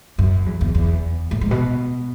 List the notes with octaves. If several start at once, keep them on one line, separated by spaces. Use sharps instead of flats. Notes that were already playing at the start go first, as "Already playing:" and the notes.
F#2
E2
E2
E2
A2
G#2
B2